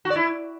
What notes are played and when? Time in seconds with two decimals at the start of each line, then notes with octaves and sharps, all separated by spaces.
0.05 F#4
0.10 D5
0.16 E4